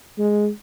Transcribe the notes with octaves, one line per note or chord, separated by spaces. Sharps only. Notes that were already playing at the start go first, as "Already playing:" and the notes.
G#3